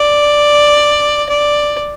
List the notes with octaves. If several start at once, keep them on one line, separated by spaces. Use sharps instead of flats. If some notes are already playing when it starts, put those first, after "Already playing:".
Already playing: D5
D5